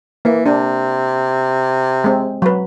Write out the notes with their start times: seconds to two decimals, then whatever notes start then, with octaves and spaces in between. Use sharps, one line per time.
0.25 E3 A#3
0.46 C3 D4
2.04 G#3 C4
2.42 F#3 B4